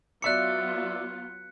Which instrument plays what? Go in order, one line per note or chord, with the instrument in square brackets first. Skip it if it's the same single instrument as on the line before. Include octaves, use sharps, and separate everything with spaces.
[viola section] F#3 B3 F4 [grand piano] D5 E5 D6 [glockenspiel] F#6 C#7